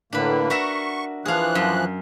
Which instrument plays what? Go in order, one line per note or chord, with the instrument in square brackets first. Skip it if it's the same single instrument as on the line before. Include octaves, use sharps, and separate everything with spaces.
[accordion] A2 D3 A#3 [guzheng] D4 B4
[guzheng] F#4 A#4 E5 [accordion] C#6
[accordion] E3 F3 F#6 [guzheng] G#4 F5
[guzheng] F#2